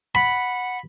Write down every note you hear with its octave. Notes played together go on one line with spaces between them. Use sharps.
F#5 B5